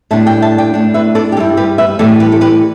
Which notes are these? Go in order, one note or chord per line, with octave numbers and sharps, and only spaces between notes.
A2 G3 D4 E5 A5
D5 G5
E5 A5
D5 G5
A2 A3 D4
B4 E5
A4 D5
G4
G2 G3 E4 A4
G4 B4
B4 E5
A2 E3 G3 A4 D5
G4 B4
A4
G4 B4